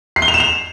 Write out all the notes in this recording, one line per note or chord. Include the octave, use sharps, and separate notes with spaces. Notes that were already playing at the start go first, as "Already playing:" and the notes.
C7
G7
F7
E7
F7